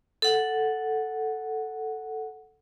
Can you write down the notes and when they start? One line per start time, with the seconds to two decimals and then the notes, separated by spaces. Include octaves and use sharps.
0.22 A4 F#5